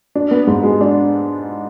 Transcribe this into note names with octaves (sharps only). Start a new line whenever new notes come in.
D4
B3
G#2
G#3
D4